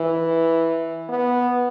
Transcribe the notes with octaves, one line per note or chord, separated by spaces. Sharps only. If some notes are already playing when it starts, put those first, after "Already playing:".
Already playing: E3
B3